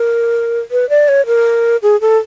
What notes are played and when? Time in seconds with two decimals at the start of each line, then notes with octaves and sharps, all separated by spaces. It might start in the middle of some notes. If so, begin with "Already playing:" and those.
Already playing: A#4
0.71 B4
0.89 D5
1.08 C#5
1.26 A#4
1.82 G#4
2.01 A4